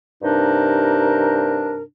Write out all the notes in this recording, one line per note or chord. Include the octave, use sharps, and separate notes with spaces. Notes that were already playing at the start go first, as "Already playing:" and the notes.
G2 C3 D4 D#4 A#4